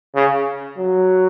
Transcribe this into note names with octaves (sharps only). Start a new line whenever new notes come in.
C#3
F#3